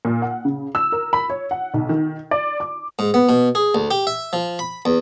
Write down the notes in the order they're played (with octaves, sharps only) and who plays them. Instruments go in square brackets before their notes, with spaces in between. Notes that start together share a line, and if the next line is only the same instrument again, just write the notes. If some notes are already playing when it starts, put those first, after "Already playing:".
[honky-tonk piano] A#2
F#5
C#3
E6
A#4
B5
C#5
F#5
B1
D#3
D5
D6
[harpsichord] G#2
B3
B2
G#4
D2
G4
E5
F3
B5
E2